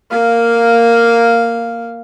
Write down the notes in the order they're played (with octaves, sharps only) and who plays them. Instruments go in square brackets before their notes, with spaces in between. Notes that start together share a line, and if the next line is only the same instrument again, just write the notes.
[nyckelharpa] A#3 F5